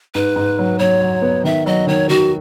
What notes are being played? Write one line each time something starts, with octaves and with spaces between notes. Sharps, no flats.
G#2 B4
G#2
F#3
F#3 C#5
F#3
B3
D#3 E5
F#3 D#5
D#3 C#5
D#3 F#4